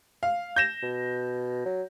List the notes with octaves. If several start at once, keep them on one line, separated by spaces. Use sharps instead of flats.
F5
G6 A#6 E7
B2
F#3